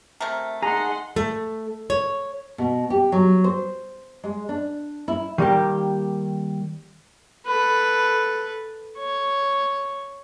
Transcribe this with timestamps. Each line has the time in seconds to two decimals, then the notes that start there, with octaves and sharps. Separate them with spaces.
0.21 C3 A3 A#4
0.62 D#4 G#4 F#5 A#5 C6
1.16 A3
1.90 C#5
2.58 B2
2.90 G4
3.12 F#3
3.44 C5
4.24 G#3
4.49 D4
5.08 E4
5.38 D#3 G3 A#3 G4
7.47 A4 B4
8.98 C#5